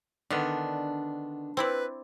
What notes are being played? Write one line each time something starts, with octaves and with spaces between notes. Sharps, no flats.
D3 D#3 B3 D4
C4 E4 B4 D5